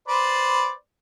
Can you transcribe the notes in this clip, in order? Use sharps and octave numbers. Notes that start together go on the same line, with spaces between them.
B4 C5 D5